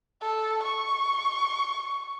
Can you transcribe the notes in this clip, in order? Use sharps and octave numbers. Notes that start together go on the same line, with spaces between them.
A4
C#6